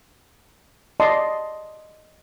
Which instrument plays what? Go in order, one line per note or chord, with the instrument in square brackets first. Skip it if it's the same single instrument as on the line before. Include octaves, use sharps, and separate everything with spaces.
[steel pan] D5 D#5 A5 C6